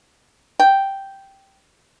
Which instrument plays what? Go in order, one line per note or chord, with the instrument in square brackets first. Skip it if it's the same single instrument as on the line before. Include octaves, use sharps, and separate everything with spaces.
[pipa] G5